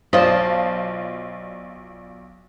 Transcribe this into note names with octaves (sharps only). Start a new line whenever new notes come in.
B1 F4 C5 D5 D#5 A5